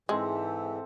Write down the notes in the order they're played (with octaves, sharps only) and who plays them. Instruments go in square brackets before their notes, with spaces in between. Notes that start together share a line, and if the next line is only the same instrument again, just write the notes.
[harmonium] G#2 E3 [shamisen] G#3 [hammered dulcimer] C4 A4 E5